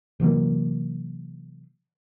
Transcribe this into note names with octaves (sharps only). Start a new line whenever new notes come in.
C3 E3 F#3 A#3